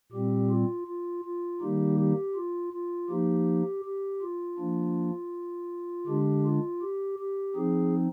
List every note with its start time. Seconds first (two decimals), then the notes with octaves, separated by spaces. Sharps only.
0.12 A#2 G3 C4 G4
0.50 F4
0.87 F4
1.25 F4
1.61 D#3 G3 A#3 D#4 G4
1.99 G4
2.35 F4
2.73 F4
3.09 F3 A#3 D#4 G4
3.85 G4
4.22 F4
4.58 F3 A#3 D4
6.07 D3 G#3 D4 G4
6.44 F4
6.82 G4
7.19 G4
7.55 F3 C4 D#4 G#4